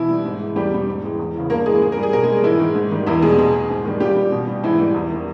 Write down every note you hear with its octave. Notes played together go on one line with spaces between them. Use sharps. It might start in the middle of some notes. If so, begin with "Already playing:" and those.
Already playing: B2 E3 E4
G3
G#2
E3 G#3
E2 G3 G4
B2 G3
G#2
E3 G#3
E2
C#3 E3
G2 A#3 A#4
E3 G#3 G#4
G#2 G#4
G3 A#4
G#4
B2 A#4
G#3 G#4
G3
G#2 E3 E4
D#3 G#3
G#2
D#3 G3
E2 E3 E4
B2 G3 G#3 G#4
B2 G#3 G#4
G#3
G#2
D#3 G3
A#2 G3 G4
G3
B2
G3
G#2 E3 E4
E3 G3
E2
D#3 G3